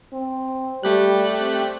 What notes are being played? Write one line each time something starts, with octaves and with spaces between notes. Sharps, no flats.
C4
G3 A3 G4 F#6
C4